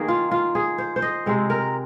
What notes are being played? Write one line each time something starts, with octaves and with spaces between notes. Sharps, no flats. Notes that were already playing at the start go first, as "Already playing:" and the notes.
Already playing: D#3 A#3 G#4
F4
F4
G#4
C5
C5
D#5
C3 G#3 C4
A#4